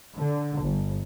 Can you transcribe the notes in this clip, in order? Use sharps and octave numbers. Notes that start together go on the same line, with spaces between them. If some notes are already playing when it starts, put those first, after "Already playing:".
D3
G1